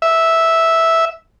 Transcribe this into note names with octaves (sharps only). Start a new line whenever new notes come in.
E5